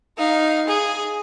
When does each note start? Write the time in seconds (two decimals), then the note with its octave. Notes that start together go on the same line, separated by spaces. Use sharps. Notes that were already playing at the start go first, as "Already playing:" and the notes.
0.18 D#4 F5
0.67 G#4